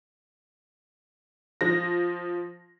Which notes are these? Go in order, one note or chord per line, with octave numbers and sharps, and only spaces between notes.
F3 A#6